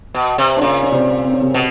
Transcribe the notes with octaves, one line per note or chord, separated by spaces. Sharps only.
B2
C3
D4
A#2 C#3 C#4
C#4
C3 C4
C4
C#4
C3 C4
B2